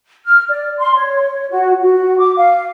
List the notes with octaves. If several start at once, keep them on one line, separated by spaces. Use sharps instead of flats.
F6
D5
C6
C#5
F#4
F#4
D6
F5